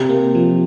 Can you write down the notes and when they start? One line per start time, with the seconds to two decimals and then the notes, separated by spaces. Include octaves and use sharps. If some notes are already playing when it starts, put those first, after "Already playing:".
Already playing: C3
0.09 A#3
0.35 F3